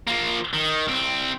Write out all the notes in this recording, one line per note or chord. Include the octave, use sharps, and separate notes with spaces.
F3 A#3
D#3
C2 C4